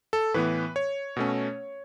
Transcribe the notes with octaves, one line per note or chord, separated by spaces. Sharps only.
A4
A2 E3 B3 B4
C#5
B2 A3 C#4